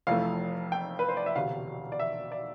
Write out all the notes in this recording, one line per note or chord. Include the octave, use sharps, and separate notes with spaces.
F1 F2 E3 A3 F5
G5
B4
C5
D5
E5
E1 D2 C3 F5
D5
E5
D5